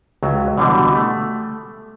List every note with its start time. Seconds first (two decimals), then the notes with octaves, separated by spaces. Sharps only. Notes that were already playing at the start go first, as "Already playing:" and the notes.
0.23 C#2 F#3
0.58 B2 D3 E3 G3
0.95 A3